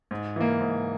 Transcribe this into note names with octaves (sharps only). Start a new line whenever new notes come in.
G#2
E3 A#3
G#2